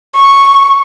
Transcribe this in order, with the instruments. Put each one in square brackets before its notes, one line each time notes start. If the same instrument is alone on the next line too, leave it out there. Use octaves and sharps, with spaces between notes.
[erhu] C#6